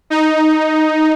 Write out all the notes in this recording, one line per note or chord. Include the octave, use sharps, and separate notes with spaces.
D#4